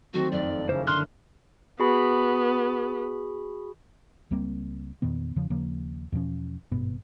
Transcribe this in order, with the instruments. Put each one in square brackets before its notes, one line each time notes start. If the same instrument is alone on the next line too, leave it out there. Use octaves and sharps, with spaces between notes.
[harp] D#3 F#3 A3 [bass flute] C4 [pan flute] F#4
[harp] F#1 F2 [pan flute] D5
[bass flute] C#3 [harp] A#3 C#4 E4 [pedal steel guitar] C5
[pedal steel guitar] D3 F6 F#6 [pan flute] C6
[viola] B3 [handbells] F#4 G#4 B5
[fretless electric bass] C#2 G3 A#3 C4
E2 A#2 D#3 B3
E2 C#3 F3
D#2 C#3 F3 A#3
E2 B2 F3 C#4
G#1 G2 B2 B3